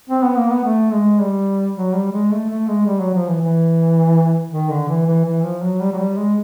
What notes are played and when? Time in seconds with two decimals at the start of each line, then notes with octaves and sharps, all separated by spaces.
0.10 C4
0.23 B3
0.37 A#3
0.50 B3
0.65 A3
0.92 G#3
1.20 G3
1.76 F#3
1.94 G3
2.12 G#3
2.31 A3
2.49 A3
2.68 G#3
2.86 G3
3.00 F#3
3.14 F3
3.27 E3
3.41 E3
4.52 D#3
4.70 D3
4.88 E3
5.07 E3
5.25 E3
5.44 F3
5.62 F#3
5.81 G3
5.93 F#3
5.99 G3
6.18 G#3